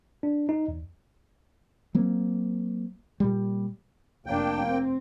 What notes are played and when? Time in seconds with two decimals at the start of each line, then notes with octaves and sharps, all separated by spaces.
0.23 D4
0.49 D#4
0.68 E2
1.95 F#3 A#3 C4
3.20 A#2 G3
4.26 F1 A#3 D4 G5
4.67 C4